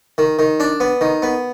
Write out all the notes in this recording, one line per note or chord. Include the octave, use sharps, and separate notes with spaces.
D#3
D#3
D4
B3
D#3
B3